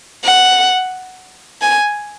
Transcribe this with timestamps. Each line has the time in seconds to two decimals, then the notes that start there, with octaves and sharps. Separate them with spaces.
0.24 F#5
1.61 G#5